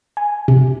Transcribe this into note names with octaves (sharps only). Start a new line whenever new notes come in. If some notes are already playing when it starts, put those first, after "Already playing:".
G#5
C3